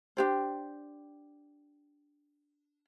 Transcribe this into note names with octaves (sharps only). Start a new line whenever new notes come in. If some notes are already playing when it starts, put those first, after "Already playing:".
D4 G4 C5